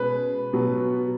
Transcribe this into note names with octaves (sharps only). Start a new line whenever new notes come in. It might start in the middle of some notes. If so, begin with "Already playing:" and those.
Already playing: B2 G#3 C#4 B4
B2 F#3 B3